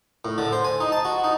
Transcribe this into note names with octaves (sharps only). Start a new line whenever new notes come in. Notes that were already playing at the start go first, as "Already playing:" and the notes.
A2
D3
C5
G#5
D#4
A5
F#4
D#4